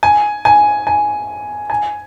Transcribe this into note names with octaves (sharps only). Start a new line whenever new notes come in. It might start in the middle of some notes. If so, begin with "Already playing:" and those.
G#5
G#5
G#5
G#5